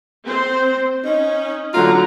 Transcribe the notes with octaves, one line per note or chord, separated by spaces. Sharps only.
C4 C5
C#4 D#4
D3 F#3 F4 A#5